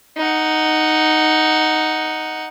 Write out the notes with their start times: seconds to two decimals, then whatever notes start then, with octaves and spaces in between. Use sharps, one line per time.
0.17 D#4 F#5